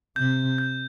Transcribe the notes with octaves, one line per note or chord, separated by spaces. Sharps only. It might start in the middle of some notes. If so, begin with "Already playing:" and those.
C3 G6
G6